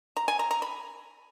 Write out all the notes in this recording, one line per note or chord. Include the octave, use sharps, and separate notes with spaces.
A#5
G#5
A#5
A#5
B5